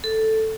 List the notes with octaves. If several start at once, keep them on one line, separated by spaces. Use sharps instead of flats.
A4